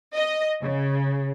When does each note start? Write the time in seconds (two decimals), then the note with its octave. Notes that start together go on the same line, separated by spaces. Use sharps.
0.16 D#5
0.62 C#3